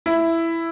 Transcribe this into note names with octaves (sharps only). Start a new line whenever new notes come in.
E4